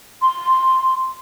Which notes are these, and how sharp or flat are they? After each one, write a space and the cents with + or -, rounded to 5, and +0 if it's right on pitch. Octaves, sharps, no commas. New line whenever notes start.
C6 +0